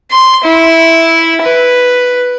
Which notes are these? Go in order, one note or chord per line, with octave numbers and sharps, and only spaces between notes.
C6
E4
B4